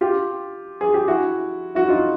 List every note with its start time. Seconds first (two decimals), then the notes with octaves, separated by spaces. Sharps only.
0.01 F4 G4
0.81 G#4
0.94 G4
1.08 E4 F#4
1.75 E4 F#4
1.88 D#4 F4